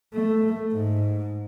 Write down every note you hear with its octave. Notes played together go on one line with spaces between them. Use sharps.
A3
G#2